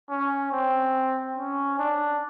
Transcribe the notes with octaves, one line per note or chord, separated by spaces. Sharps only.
C#4
C4
C#4
D4